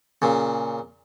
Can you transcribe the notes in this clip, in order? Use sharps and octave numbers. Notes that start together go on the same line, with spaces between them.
A#2 C#3